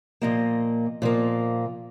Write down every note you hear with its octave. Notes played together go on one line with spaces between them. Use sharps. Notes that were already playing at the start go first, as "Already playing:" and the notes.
A#2 F3 A#3 D#5
A#2 F3 A#3